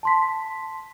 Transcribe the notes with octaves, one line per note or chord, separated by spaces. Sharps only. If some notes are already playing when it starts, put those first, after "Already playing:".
A5 C6 B6